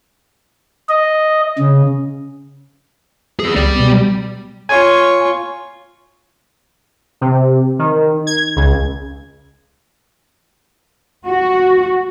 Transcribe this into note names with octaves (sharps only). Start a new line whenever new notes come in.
D#5
C#3
B3 G#4
C#2 G3 D5
B2 B3
F4 C#5 G#5
C3
D#3
G#6
C#2
F#4